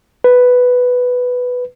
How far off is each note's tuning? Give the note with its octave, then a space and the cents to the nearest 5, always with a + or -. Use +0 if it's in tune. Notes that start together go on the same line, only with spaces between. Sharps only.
B4 +5